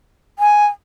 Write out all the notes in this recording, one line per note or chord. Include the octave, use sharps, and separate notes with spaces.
G#5